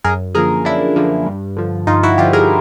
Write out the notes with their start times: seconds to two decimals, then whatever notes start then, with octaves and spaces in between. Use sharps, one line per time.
0.04 F#2 G#4 A#4
0.35 D3 F3 A#3 G#4 A#4
0.65 F#2 D4 E4
0.96 D3 F3 A#3
1.26 G2
1.57 D3 F3
1.87 G2 D#4 F4
2.03 E4 F#4
2.18 D3 F3 F4 G4
2.33 G#4 A#4